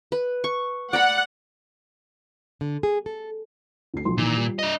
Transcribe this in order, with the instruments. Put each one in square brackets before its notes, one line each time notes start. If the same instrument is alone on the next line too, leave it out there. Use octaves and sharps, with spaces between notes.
[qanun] B4
C#6
[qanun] D5 A#5 B5 [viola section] F#5
[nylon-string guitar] D3
G#4
A4
[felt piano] D2 C7
B1 F3 C6
[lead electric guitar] A#2 [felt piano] D#3 E3
[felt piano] G3 F4
[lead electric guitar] D4 D#5